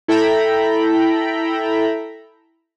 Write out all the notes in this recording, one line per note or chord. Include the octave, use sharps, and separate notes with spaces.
E4 A4 E5 G5 A#5 B5